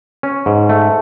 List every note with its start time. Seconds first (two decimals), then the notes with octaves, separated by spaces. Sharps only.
0.23 C#4
0.46 G#2
0.69 A3